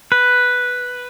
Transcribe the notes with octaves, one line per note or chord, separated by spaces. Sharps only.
B4